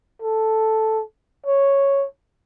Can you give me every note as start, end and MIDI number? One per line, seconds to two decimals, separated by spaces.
0.22 1.02 69
1.46 2.06 73